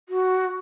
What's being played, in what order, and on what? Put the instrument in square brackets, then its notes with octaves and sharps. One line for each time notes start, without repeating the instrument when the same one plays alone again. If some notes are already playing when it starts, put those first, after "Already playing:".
[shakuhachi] F#4